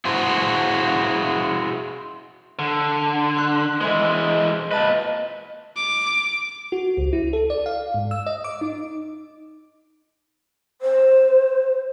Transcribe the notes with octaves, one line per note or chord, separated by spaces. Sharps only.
E4 F#4 G#4 C5
D3
C6 F#6
E3 G#3 C5 D#5 G#6
A#2 B4 D#5 A5
D6
F#4
C#2
E4
A4
D5
F5
G#2
E6
D#5
D6
D#4
C5